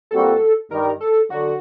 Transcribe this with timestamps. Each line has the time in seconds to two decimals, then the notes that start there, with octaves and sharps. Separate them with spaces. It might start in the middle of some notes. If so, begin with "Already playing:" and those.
0.11 A#2 G3 C4 F#4 A4
0.70 G2 D#3 G3 A#4
1.00 A4
1.30 D3 F#3 F#4